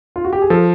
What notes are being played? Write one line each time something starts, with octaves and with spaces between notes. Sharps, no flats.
F4
F#4
G4
G#4
F3 A4